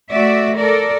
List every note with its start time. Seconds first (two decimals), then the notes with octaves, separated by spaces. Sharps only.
0.12 A3 F#4 D5 E5
0.58 A4 A#4 D5